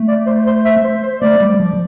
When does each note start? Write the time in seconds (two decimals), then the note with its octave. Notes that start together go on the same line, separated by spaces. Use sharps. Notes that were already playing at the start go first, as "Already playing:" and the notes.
Already playing: A3
0.08 D5
0.27 C5
0.47 C5
0.65 E5
0.84 C5
1.03 C5
1.22 A3 D5
1.41 G3
1.60 F3